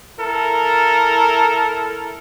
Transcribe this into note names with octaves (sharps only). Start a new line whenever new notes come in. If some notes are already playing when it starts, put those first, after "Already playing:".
E4 A4 A#4